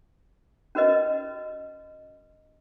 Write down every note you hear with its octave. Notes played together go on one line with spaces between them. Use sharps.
C#4 F#4 A#4 B4 D#5